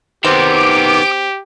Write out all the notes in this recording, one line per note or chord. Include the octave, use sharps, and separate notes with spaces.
D#3 B3 C4 G4 D6